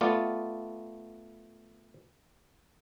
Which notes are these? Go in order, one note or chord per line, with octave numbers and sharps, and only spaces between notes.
A3 B3 F4 D5